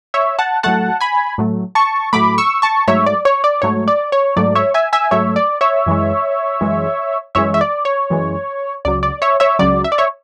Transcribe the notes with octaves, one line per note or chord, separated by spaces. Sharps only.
C#5 E5
F#5 A5
A2 F#3 A3 F#5 A5
G#5 B5
A2 F#3 A3
A5 C#6
A2 F#3 A3 B5 D6
C#6 E6
A5 C#6
G#2 F#3 A3 C#5 E5
D5
C#5
D5
G#2 F#3 A3 C#5
D5
C#5
G#2 F#3 A3 D5
C#5 E5
E5 G#5
E5 G#5
G#2 F#3 A3 C#5 E5
D5
C#5 E5
F#2 E3 G#3
F#2 E3 G#3
F#2 E3 G#3 C#5 E5
E5
D5
C#5
F#2 E3 G#3
C#2 C#3 F#3 D5
D5
C#5 E5
C#5 E5
C#2 C#3 F#3 D5
E5
D5
C#5 E5